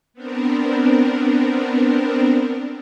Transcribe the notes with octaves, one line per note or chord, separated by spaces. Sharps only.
B3 C4 D4 A#4